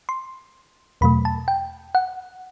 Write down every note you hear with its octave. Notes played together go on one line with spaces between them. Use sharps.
C6
E2 B2 F#3 A3 B5
A5
G5
F#5